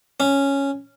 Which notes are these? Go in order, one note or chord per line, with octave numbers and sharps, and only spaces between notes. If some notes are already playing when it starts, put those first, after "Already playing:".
C#4